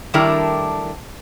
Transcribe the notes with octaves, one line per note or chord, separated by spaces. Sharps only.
D#3 G3 A3 D4 E4 A#4